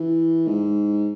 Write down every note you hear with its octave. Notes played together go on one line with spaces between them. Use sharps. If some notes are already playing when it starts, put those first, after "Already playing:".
Already playing: E3
G#2